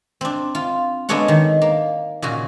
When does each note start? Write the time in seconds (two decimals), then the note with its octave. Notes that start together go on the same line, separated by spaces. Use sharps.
0.21 C4 D4
0.55 F4
1.09 G#3 B3 D4 A4 C#5 F#5
1.28 D#3
1.62 A#3
2.22 A#2 C#3 F#4